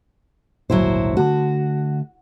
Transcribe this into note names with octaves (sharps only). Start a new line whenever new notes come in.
G#1 D2 A#2 F#3 E4 C5
D3 A3 F#4